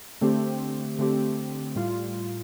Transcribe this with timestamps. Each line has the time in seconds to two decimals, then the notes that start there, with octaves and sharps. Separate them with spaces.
0.21 D3 A3 C4 G4
0.98 D3 A3 C4 G4
1.75 A2 G3 F4